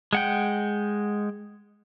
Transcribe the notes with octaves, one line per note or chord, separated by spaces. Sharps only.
G#3 F#5 G5